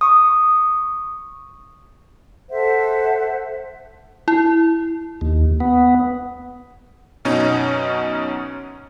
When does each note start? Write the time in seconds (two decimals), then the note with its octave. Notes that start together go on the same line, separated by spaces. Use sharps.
0.01 C#6 D#6
2.50 A4 C5 E5 F#5
4.28 E4
5.21 D#2
5.60 B3
7.25 F#2 B2 C#4 D#4